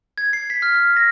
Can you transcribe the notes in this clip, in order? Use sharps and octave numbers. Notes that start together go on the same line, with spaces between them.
G#6
C7
B6
F6
F6
A#6